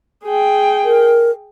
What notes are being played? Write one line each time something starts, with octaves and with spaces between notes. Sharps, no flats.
G#4 G5
A#4